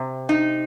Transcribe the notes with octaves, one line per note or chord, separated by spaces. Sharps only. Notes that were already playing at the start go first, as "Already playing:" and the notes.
Already playing: C3
D#4